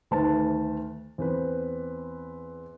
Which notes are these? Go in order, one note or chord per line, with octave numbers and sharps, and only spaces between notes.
D2 D#3 A3 B4 A5
E2 C4 B4